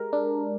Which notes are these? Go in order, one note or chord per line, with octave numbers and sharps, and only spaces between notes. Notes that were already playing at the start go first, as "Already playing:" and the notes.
Already playing: G#3 G4 A#4
D4